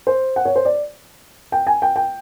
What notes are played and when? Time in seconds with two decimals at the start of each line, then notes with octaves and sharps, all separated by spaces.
0.07 C5
0.36 F#5
0.45 C#5
0.56 C5
0.65 D5
1.52 G5
1.67 G#5
1.82 G5
1.96 G5